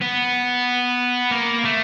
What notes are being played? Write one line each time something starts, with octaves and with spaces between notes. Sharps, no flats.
B3
A#3
A3